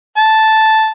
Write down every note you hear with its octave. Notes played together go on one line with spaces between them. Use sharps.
A5